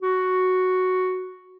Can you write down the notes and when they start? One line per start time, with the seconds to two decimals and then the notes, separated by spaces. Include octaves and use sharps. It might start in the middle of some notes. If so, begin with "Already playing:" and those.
0.02 F#4